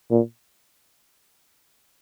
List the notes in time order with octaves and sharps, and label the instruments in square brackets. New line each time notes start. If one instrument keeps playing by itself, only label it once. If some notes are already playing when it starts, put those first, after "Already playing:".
[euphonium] A#2